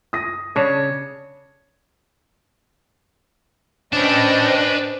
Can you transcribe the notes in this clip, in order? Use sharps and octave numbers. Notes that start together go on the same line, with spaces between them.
D#6 A#6
C#3 D4 C#5
C#4 D4 B4 C5 D#5 G5 A5